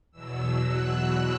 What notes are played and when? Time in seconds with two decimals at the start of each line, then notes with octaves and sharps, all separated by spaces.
0.12 E2 B2 F#3 E6
0.66 F#6